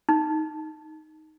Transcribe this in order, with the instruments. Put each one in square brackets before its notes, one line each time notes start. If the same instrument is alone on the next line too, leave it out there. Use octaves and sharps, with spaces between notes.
[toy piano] D#4